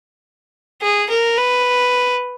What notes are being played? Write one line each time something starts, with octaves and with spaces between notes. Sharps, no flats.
G#4
A#4
B4